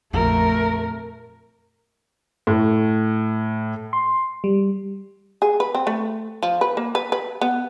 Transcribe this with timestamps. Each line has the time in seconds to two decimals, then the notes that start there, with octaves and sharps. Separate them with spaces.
0.13 A#1 F2 A3 A#4
2.47 A2
3.93 C6
4.44 G3
5.42 G#4
5.60 B4
5.75 C4
5.87 A3
6.43 F3
6.61 B4
6.77 A#3
6.95 B4
7.12 B4
7.41 B3